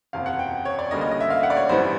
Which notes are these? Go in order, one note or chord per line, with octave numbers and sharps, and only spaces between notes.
F#1 E2 C3 F5
F#5
G5
C#5
D5
D2 D3 G3 A#3 C#4 D#5
D#5
D#5
E5
F5
F#5
D5
C#5
A1 G2 E3 G3 B3 C5